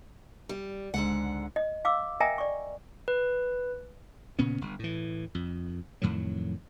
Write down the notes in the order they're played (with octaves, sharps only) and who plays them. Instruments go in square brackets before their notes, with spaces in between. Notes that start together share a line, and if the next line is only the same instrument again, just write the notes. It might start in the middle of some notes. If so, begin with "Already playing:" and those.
[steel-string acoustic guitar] G3
[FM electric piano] C#2 G#3 [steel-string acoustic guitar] G#2 D3 F#5
[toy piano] D#5
F5 D6 E6
A#4 D#5 E5 G5 G#5 A#5
D5 C#6
[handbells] B4
[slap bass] A#2 C#3 B3 C#4
G1
A2 E3
F2
F2 A2 D#3 F#3